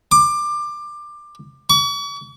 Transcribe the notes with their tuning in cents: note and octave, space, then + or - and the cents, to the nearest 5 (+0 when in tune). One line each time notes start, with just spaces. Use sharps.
D6 +20
C#6 +45